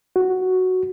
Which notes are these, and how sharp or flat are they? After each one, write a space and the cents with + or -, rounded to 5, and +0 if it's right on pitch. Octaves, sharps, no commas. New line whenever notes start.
F#4 +0